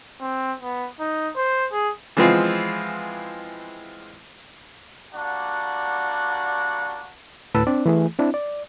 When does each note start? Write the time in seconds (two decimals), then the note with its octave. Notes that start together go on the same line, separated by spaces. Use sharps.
0.20 C4
0.62 B3
1.00 D#4
1.36 C5
1.72 G#4
2.17 E3 F3 G#3 B3 C4 F4
5.14 G3 A#3 D4 F#4 F#5
7.55 D2 A2 B4 A5 E6
7.67 C4 D4 D5
7.86 E3 A3 G#4
8.19 C4 D4 E4
8.34 D5